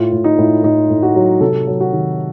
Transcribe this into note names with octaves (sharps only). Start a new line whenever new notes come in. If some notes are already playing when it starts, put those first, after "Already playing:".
Already playing: A2 F4
A2
D#4
A2
A2 D#4
A2
F#4
F#3
C3 A4
F#3
F#4
D#3